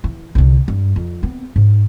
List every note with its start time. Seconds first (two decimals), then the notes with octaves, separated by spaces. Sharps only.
0.04 E3
0.35 C2 D3
0.68 G2
0.96 F2
1.23 B3 C4
1.56 G#2